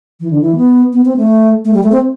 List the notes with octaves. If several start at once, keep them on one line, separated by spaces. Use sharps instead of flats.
E3
D3
E3
B3
B3
C4
A3
A3
G3
A3
C4